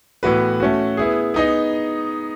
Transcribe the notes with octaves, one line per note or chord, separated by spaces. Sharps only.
A2 E3 B3 F#4 B4
A3 C#4 F#4
B3 E4 G#4
B3 D#4 G#4 D#5